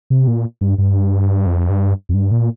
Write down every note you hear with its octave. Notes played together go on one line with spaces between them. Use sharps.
C3
A#2
G2
G2
F2
G2
F2
G2
A#2